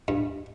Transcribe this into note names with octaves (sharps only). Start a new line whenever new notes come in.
G2